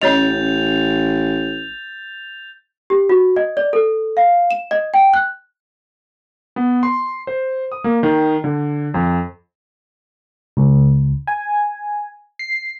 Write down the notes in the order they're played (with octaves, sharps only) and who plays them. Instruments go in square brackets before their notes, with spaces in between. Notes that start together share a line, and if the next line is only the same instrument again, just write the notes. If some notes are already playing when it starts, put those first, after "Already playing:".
[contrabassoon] A1 [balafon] C#4 C#5 D#5 [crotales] G6 A6 F7
[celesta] G4
F#4
D#5
D5
A4
F5
E7
D#5
G5
F#6
[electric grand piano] B3
C6
C5
D#6
A#3
D#3
D3
F2
[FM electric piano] C#2
G#5
C7